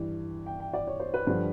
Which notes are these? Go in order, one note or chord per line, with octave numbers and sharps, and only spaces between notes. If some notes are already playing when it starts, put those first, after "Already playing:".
Already playing: G2 E3
G5
G5
D5
C#5
C5
B4
G2 D3 F3